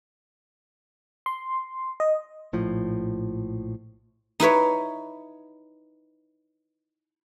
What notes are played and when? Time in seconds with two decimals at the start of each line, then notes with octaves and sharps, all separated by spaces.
1.26 C6
2.00 D#5
2.53 A#1 A2 F3
4.40 D#4 E4 B4 C#5